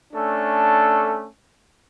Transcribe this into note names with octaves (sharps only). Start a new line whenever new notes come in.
A3 C#4 D4 A4